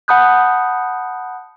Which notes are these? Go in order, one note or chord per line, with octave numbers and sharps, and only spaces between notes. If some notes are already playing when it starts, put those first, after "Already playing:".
F#5 A5 B5 D#6 F#6 G6